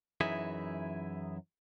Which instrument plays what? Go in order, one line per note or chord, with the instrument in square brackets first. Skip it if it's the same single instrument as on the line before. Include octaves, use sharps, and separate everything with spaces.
[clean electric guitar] F#2 E3 D#4 E4 G#4 E5